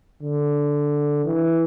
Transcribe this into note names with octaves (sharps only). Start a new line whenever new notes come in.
D3
E3